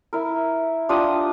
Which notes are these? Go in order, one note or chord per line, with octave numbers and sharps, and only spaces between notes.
E4 A#4
D4 F4 G4 D#6